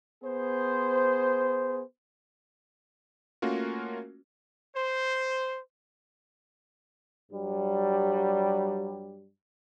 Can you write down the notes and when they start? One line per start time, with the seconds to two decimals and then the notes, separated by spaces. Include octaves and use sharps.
0.23 B3 G#4 C5
3.42 A3 A#3 C#4 F4 F#4 A#4
4.76 C5
7.32 G2 F#3 G3